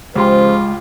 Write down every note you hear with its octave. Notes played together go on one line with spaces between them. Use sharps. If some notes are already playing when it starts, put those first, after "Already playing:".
C#2 C#3 F3 G#3 F4 G4 C5 C6